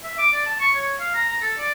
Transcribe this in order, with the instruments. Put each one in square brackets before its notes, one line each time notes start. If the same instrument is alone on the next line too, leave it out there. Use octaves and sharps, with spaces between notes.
[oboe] E5
D6
D5
A5
C#6
C#5
F5
A#5
A#5
A4
D5